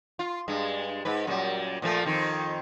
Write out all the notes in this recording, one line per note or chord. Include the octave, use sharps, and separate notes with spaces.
F4
G2 G#3
G#2 B4
F#2 A#2 G3
A#2 F3 A3
F2 D#3 C4